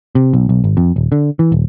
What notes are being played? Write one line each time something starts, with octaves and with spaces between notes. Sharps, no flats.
C3
B1
B1
G#1
F2
D#1
D3
E3
D#1